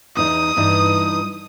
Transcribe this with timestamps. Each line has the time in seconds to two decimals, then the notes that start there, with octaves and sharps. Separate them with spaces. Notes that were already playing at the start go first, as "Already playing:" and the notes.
0.17 E2 D#4 D#6
0.57 G2 E3 D#4